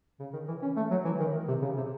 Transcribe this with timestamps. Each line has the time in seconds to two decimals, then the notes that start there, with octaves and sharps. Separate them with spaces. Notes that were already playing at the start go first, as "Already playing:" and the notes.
0.20 C#3
0.33 D#3
0.48 E3
0.62 C#4
0.76 A3
0.91 F#3
1.05 E3
1.20 D#3
1.48 C3
1.62 C#3
1.77 C3